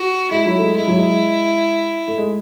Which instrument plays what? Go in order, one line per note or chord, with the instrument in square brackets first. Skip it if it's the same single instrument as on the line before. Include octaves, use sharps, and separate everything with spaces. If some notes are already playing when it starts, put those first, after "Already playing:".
Already playing: [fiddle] F#4
[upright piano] G#3 [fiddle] E4
[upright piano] F#3
A3
G#3
[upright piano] G#3 [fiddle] E4
[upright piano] F#3
G#3
A3
G#3